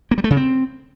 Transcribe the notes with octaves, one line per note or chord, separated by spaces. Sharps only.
A#3
G3
A3
C#3
C4